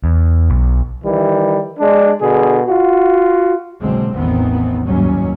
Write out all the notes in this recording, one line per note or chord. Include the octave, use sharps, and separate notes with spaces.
E2
B1
D#3 E3 G3
G#3 D4
B2 D3 G#4
F4 F#4
F#1 B1 B2 D3 G#3 C4
A1 E2 D#3 E3 B3 C4
F#1 D#2 G#2 F#3 G3 C#4